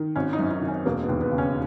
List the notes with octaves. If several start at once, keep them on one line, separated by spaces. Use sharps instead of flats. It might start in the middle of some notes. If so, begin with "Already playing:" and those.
Already playing: D#3
G#1 C#4
D#4
F#2
D#4
D#3
C#4
E1 A#3
B3
D#2
B3
C#3
C#4